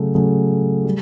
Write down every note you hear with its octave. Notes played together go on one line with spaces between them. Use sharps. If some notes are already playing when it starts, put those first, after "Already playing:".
Already playing: C#3 F#3 A3
C#3 F#3 A3
G3